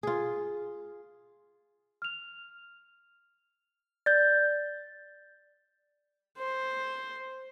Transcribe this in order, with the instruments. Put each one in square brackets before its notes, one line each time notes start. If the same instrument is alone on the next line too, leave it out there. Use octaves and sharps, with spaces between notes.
[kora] F4 G#4
[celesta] F6 F7
[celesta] D5 [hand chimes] G6 A6
[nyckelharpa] C5